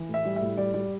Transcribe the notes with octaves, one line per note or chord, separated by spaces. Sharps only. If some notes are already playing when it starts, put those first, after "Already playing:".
Already playing: E3
A2
E5
G3
A2 E5
G3 D5
G3 D5